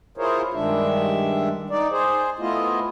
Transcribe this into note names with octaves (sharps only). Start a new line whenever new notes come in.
E4 F4 G#4 A#4 C5 C#5
G2 D#3 G#3 D4 E5
D#4 D5
G#4 C5
A3 B3 E4 F4 D#5